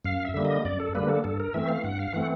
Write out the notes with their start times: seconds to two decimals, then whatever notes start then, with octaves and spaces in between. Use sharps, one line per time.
0.05 F#2 F5
0.25 E5
0.34 D3 G3 A#3
0.45 D#5
0.65 F#2 D5
0.80 A4
0.95 D3 G3 A#3 B4
1.09 A4
1.24 G2 A4
1.40 A#4
1.54 E3 A3 C4 E5
1.69 F5
1.84 G2 F#5
1.99 F5
2.13 E3 A3 C4 F#5